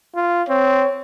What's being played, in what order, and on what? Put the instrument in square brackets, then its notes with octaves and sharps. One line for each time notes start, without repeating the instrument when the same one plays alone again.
[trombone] F4
[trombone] C4 [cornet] C#5